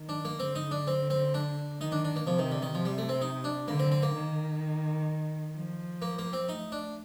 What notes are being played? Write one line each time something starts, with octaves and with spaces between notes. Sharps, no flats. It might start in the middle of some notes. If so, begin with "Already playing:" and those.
Already playing: D#3
D4
A#3
D3 C4
D#4
D4
C4
C4
D4
D#3 D#4
D4
D4
A#3
C3 F3
D#3
D3
D#3
C3 F3
G3
A3
C4
D#4
D4
D3 A#3
C4
C4
A#3
D#3
F3
A#3
A#3
C4
A3 D#4
D4